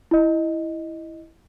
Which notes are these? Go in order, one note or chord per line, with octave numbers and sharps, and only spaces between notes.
E4 D#5